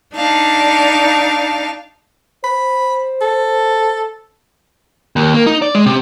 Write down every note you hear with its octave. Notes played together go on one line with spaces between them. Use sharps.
D4 D#4 F5 A5
C5 B5
A4
D#2
A#3
D#4
D5
G#3
C3